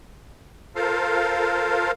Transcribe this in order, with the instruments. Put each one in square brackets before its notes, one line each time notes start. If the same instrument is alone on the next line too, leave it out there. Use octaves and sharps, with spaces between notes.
[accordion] F4 A4 A#4 C5 F5